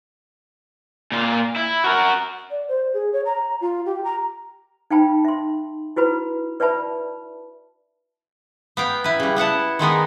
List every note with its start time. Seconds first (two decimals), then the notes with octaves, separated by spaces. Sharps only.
1.12 A#2 F4
1.56 E4
1.84 F#4 A#4
2.50 D5
2.68 C5
2.94 G#4
3.13 C#5
3.25 A#5
3.61 F4
3.86 G4
4.04 A#5
4.91 D#4 F5 G5 A5 B5
5.24 E5 C6
5.96 E4 F#4 B4 B5
6.60 B4 D5 E5 A5 B5
8.77 B3 F5 G5
9.04 E4 B4
9.20 C#3 G3
9.36 B3 E4 F#5 A5
9.79 D#3 G#3 B3 D#4